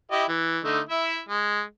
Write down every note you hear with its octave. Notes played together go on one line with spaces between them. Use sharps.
E4 G4 D#5
E3
D3 A3 D#4
E4 E5
G#3